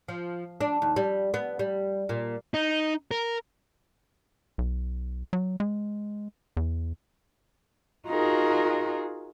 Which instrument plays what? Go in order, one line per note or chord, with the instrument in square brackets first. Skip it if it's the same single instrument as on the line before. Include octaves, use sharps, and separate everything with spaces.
[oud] F3
D4
D#2
G3
B3
G3
A#2
[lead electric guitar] D#4
A#4
[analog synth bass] B1
F#3
G#3
E2
[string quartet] D#4 F4 F#4 G#4 A#4